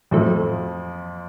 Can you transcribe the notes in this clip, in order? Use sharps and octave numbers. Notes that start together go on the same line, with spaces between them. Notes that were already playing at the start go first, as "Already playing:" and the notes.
F2 A2 F3 F#3 A3